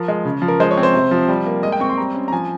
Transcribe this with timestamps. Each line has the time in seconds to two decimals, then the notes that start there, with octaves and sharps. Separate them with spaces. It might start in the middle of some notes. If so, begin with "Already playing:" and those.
Already playing: F3 A#4
0.08 G#3
0.25 C#3
0.42 F3
0.48 A#4
0.60 G#3 C5
0.71 C#5
0.77 C4
0.83 C5
0.93 C3
1.11 F3
1.28 G3
1.46 A#3
1.63 G#3 D#5
1.72 G5
1.80 C4 C#6
1.90 C6
1.98 G3 A#5
2.15 C#4
2.28 A#5
2.32 F3 G#5